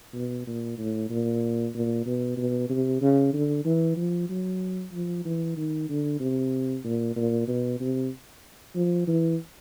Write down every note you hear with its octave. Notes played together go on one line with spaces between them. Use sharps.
B2
A#2
A2
A#2
A#2
B2
B2
C3
C#3
D3
E3
F3
F#3
F3
E3
D#3
D3
C3
A#2
A#2
B2
C3
F3
E3